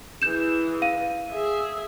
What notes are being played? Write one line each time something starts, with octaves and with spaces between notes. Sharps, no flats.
E3 G#4 G6 E7
F5 D#7
G#4 E5